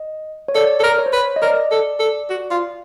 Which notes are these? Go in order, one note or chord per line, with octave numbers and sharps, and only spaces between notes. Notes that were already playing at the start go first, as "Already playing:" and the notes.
Already playing: D#5
C#5
A4 D5
A4
A#4
C#5
C5
B4 C#5
D#5
A#4 D5
A4
A4
F#4
F4